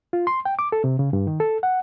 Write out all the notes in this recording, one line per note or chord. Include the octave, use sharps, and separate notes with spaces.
F4
C6
G5
D6
A4
C3
C#3
G2
D#3
A4
F#5